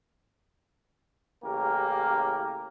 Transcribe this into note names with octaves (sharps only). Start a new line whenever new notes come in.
A1 C#3 A#3 G4 A#4